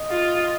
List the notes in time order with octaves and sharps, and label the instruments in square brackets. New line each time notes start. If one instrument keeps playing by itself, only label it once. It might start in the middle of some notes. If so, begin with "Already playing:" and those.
Already playing: [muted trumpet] D#5
[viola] F4